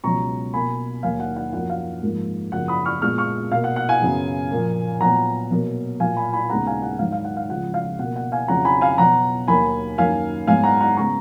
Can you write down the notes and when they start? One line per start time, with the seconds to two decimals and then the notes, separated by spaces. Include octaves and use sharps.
0.04 C#2 B2 F#3 A#5 C#6
0.53 B2 A#3 G#5 B5
1.03 D#2 D#3 F#3 A#3 F5 G#5
1.20 F#5
1.36 F#5
1.53 F#2 F3 A#3 F#5
1.70 F5
2.02 G#2 F3 A#3
2.52 F#2 C#3 F3 A#3 F#5
2.68 B5 D#6
2.85 C#6 F6
3.02 A#2 G#3 B3 C#6 F6
3.18 C#6 F6
3.51 B2 A#3 F5
3.64 F#5
3.76 F#5
3.89 F5 G#5
4.01 F#2 C#3 F#3 B3
4.51 A#2 F3 A#3
5.01 A#2 F#3 B3 F#5 A#5
5.51 B2 F#3 A#3
6.00 A#2 F#3 A#3 F5 G#5
6.17 G#5 B5
6.33 G#5 B5
6.50 D#2 C#3 G#3 B3 F#5 A#5
6.67 F5 G#5
6.82 F#5
6.99 G#2 D#3 F#3 F5
7.12 F5
7.24 F#5
7.37 F5
7.49 C#2 C#3 F3 F#5
7.74 F5
7.99 B2 A#3 F#5
8.16 F#5
8.32 F5 G#5
8.48 F2 C#3 F#3 F#5 A#5
8.65 G#5 B5
8.81 F5 G#5
8.98 B2 F#3 B3 F#5 A#5
9.48 D#2 D#3 F#3 A#3 G#5 B5
9.98 F#2 D#3 F#3 A#3 F5 G#5
10.47 G#2 F#3 B3 F5 G#5
10.64 F#5 A#5
10.81 F#5 A#5
10.97 C#3 G#3 B3 A#5 C#6